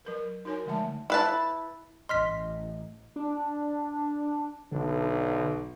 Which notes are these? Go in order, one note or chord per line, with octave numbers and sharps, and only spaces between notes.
F#3 A#4 B4
D#4 F#4 A#4 C#5 G#5
D3 F3 G#3 A3 E5 A5
E4 B4 A5
A1 D#5 C6 F6 B6
D4
B1 D3